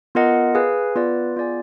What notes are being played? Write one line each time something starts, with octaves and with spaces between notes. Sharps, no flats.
B3 F4 A#4 D#5 F#5
G#4 B4 F5 G#5
B3 F4 B4 D5
B3 F4 G#4 D5 G#5